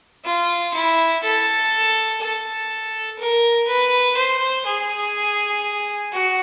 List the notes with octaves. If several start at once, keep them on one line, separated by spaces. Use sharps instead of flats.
F4
E4
A4
A4
A#4
B4
C5
G#4
F#4